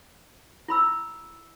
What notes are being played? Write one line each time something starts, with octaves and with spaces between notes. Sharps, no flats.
E4 B5 E6